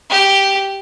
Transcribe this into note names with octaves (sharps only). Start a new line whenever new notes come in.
G4